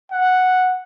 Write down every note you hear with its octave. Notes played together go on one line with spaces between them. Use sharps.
F#5